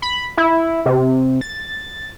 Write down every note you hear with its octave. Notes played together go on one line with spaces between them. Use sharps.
B5
E4
C3
A6